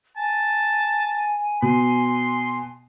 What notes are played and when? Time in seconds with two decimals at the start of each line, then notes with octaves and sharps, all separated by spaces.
0.16 G#5 A5
1.62 B2 C6